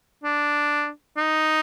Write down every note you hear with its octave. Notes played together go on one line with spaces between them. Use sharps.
D4
D#4